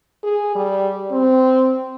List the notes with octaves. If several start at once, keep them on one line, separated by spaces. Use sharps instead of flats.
G#4
G3
C4